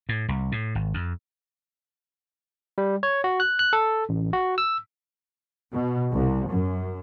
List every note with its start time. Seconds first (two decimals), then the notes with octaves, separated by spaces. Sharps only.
0.09 A2
0.28 C2
0.52 A2
0.75 G#1
0.94 F2
2.78 G3
3.03 C#5
3.24 F#4
3.40 F#6
3.59 F#6
3.73 A4
4.09 A1
4.33 F#4
4.58 E6
5.73 B2
6.11 C2
6.49 F#2